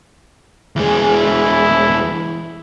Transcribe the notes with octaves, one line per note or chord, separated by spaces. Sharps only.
E2 G#3
E4